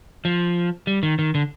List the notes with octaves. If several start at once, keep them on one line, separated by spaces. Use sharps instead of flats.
F3
G3
D#3
D#3
D3